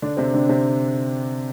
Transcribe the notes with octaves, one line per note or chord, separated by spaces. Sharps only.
D3 D4
C3 C4
D3 D4
C3 C4